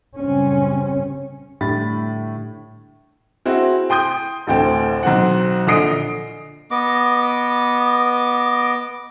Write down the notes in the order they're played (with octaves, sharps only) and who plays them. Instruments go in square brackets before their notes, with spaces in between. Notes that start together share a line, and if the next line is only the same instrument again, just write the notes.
[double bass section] F#2 C#3 G3 C4 C#4
[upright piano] A2 D3 G3 B5 A6
C4 E4 F#4 G#4
G5 C6 D#6 G6
A1 D2 A3 C4 G5
B1 C4 F#5
A#1 D3 D#5 D#6 C7 D7
[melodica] B3 D#5 D6